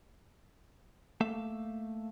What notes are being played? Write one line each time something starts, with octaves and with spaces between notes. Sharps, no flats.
A3 A#3 E5 F5